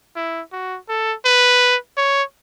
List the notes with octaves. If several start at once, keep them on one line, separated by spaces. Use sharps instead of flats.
E4
F#4
A4
B4
C#5